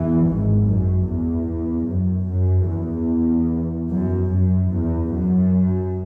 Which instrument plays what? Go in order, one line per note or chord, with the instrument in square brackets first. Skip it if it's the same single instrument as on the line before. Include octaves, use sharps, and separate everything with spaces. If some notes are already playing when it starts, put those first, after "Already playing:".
Already playing: [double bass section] E2 E3
G#1 G#2
F#2
E2
F#2
F#2
E2
F#2
F#2
E2
F#2